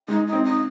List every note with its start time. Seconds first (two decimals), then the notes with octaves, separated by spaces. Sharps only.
0.08 G#3 D#4
0.27 D#4
0.32 C4
0.45 D#4